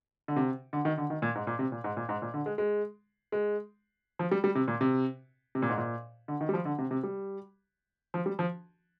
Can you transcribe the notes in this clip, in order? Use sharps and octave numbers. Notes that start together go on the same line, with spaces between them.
D3
C3
D3
D#3
D3
D#3
A#2
G#2
A#2
C3
A#2
G#2
A#2
G#2
A#2
D3
G#3
G#3
G#3
F3
G3
G3
C3
A#2
C3
C3
A#2
G#2
A#2
D3
D#3
G3
F3
D3
C3
C3
G3
F3
G3
F3